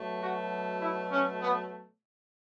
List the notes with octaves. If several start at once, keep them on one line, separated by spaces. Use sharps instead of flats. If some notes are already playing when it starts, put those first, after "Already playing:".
Already playing: B2 F#3 A3
F#4
E4
C#4
B3